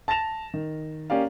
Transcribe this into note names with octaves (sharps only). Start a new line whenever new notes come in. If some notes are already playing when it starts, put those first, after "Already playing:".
A5 A6 A#6 E7 F7
D#3
A#3 C#4 G4 D5 F5